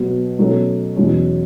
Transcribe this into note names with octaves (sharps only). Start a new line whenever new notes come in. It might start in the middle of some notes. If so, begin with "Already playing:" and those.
Already playing: B2 F#3 B3 F#4
B2 F#3 A3 C#4
E2 B2 F#3 C#4 F#4